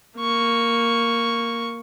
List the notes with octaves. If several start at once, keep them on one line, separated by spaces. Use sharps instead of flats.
A#3 C#6